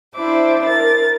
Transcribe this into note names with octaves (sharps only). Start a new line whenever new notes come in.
D4 E4 C5 E5 D6
A#4 A6